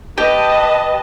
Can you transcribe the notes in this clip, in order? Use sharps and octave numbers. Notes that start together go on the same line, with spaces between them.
G4 B4 D#5 A5